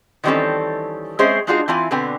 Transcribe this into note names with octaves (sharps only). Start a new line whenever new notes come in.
D#3 E3 G3 C4 C#4 A4
G#3 C4 C#4 G#4 C5 E5
G#3 D4 D#4 F4 F#4 G#4
E3 C4 E4 F4 G#5
B2 D3 B3 C4 G#5